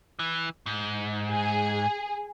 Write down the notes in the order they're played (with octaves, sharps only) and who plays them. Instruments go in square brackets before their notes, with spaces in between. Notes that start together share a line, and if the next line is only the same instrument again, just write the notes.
[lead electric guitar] E3
G#2
[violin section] G#4